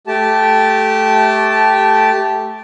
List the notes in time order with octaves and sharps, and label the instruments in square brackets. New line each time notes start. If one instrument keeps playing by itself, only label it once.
[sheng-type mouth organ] A3 G4 A5